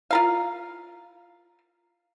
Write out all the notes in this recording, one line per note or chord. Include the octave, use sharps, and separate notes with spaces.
F4 A#4 F5